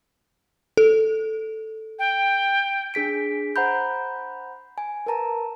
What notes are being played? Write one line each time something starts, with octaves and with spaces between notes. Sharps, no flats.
A4
G5
D4 G#4 B6 D7
C5 F#5 A#5 B5 G6
G#5
A#4 B4 A5 A#5